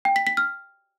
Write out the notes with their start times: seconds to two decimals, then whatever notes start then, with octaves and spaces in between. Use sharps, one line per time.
0.05 G5
0.16 B6
0.27 B6
0.37 F6